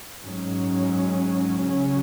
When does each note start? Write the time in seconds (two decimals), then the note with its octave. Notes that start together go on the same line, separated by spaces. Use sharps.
0.23 G#2 F#3 C#4
1.63 C#3 F#3 C#4